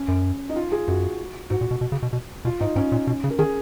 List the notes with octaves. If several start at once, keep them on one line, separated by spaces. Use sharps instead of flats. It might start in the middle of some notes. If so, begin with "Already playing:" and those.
Already playing: C#4
F#2
D#4
F4
G#4
F#2 F#4
G#2 F#4
A#2
B2
B2
C#3
B2
B2
B2 F4
G#2 D#4
G#2 C#4
A#2
B2
C#3
A#4
D#3 G#4